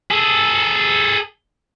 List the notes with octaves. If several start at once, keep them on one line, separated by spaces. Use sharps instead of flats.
G#4 A4